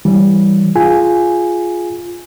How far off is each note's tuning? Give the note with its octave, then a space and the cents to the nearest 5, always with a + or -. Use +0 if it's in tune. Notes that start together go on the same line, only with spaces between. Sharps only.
E3 +0 G3 +0
F4 +0 G#4 +5 G#5 +0